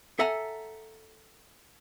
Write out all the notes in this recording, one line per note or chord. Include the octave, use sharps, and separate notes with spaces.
A4 E5 F#5 G#5 A#5